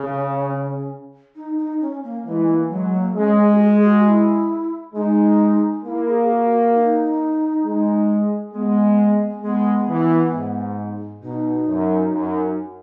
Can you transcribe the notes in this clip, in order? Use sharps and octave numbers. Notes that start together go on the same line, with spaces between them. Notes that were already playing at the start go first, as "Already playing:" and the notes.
Already playing: C#3 C#4
D#4
D#4
C#4
A#3
E3 G#3
A#3
F#3 G#3
A#3
G#3 C#4
G#4
F#4
G#4
F#4
E4
G#3 D#4
A#3 E4
G#4
F#4
F#4
D#4
G#3
G#3 B3
G#3 B3
E3
G#2
B2 D#4
F#2
F#2